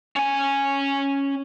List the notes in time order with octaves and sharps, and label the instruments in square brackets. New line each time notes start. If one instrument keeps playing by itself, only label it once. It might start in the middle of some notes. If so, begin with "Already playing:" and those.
[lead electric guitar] C#4 G#5